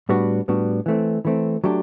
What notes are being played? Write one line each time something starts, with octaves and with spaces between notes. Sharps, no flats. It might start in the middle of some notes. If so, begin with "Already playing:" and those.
A2 G3 B3 D4 F#4
A2 G3 B3 D4 F#4
E3 A3 C4
E3 A3 C4
F#3 A3 D4 G4